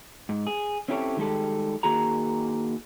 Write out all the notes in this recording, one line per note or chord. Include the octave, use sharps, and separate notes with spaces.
G#2
G#4
C4 C#4 E4 G4 A4 C#5
D#3 G3 G#3 G4 A4
D#3 A#3 F#4 G#4 A#5